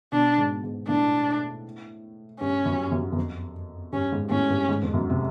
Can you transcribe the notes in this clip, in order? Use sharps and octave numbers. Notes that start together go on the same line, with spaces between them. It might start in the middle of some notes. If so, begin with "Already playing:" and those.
B2 D4
G#2
G#2
A2 D4
G2 C#4
F#2
F#2
F#2
F2
G2 C#4
G#2
A2 C#4
G2
G#2
F2
F#2
C3